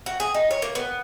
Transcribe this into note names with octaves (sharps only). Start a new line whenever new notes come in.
F#4
G#4
D#4
C#5
A#3
B3